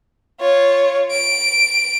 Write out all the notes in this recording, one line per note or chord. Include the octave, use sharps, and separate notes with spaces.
F4 C#5
D7